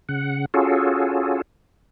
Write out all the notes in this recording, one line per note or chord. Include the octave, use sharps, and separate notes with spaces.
C#3 F#5
C#4 F4 F#4 G#4 A4